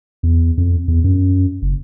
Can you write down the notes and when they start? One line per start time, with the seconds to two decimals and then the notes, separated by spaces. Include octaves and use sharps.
0.23 E2
0.57 F2
0.88 E2
1.04 F#2
1.62 F#1